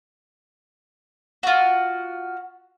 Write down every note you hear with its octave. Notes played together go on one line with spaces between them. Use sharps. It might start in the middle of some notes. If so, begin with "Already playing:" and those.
F4 F#4